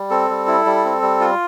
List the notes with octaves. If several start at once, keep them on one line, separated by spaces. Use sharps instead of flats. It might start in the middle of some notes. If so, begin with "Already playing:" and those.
Already playing: G3
C4 A4
G3
E4
G3
C4
G3
F4